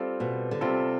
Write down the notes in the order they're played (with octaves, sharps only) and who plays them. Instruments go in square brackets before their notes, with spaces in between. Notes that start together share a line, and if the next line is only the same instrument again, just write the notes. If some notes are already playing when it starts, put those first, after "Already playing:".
Already playing: [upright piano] G3 C4 F4 A4
[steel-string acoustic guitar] B2
D3
[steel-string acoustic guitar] C3 [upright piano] G3 C4 F4 A4